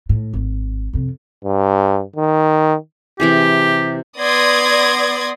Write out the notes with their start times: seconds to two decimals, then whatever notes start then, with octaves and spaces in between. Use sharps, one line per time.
0.09 A2
0.33 G#1
0.93 F2 C3
1.45 G2
2.16 D#3
3.20 C3 E3 G4 G#4
4.17 B3 D5 C6 D#6 G#6 A#6